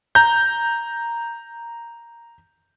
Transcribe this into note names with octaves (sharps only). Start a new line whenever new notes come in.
A#5 G6